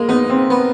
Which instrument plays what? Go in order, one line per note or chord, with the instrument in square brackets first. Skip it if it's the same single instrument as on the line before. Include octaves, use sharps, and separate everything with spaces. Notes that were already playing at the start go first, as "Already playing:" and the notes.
Already playing: [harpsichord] G#3 [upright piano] A#3
[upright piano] B3 [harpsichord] D#4
[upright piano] C4
[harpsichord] B3